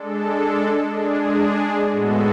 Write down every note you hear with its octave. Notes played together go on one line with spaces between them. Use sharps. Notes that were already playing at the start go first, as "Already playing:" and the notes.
Already playing: G#3 D4 A4
G#3 D4 G#4
A2 G#3 B3 F#4 A4